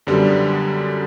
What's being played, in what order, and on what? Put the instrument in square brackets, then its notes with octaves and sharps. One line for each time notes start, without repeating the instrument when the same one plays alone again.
[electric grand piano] F#2 D3 G3 B3